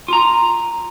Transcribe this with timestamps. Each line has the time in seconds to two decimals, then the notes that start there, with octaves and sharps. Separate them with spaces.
0.08 F4 A#5